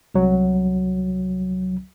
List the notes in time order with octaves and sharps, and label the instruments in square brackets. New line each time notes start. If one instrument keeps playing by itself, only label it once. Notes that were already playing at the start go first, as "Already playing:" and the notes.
[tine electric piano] C2 F#3